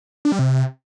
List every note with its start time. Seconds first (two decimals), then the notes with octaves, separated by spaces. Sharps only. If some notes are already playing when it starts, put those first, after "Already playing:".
0.25 D4
0.32 G3
0.39 C3